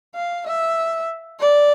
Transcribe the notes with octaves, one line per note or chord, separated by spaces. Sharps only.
F5
E5
D5